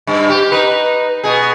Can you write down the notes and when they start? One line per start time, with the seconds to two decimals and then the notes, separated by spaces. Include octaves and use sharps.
0.07 G2
0.29 G4
0.52 D#4 B4
1.24 B2 G#4